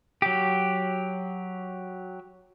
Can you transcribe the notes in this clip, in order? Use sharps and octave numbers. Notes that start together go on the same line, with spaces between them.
F#3 G4